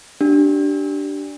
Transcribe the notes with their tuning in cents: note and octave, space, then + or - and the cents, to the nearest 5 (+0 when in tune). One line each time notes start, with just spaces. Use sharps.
D4 +0 G4 -20